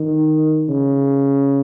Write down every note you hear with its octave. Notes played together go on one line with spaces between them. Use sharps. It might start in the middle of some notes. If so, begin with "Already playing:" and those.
Already playing: D#3
C#3